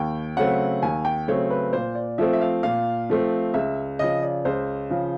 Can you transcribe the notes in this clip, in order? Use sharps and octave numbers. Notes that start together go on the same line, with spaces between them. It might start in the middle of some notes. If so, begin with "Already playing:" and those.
Already playing: D#2 G5
C#3 F#3 A3 C4 F#5
D#2 G#5
G5
C#3 F#3 A3 C4 C#5
B4
A#2 C5
D5
F3 A3 C4 E5
E5
F5
A#2 F5
F3 A3 C4
C#2 E5
C#3 F3 D#5
D5
C#2 C5
C#3 F3